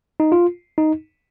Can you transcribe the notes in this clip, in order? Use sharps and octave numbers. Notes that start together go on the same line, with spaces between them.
D#4
F4
D#4